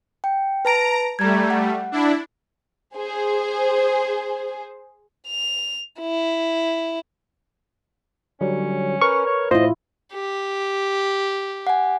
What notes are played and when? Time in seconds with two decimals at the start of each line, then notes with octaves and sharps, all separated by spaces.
0.24 G5
0.65 B4 A5 A#5 D7
1.19 G3 A3 A#5 G#6
1.50 F#5
1.92 D4 E4
2.96 G#4 C5
5.27 F7
6.01 E4
8.41 D3 F#3 G3 C#4
9.01 A#4 B4 C#6 F6
9.26 C#5
9.51 A2 E4 F4 C5 D#5
10.13 G4
11.67 F#5 G#5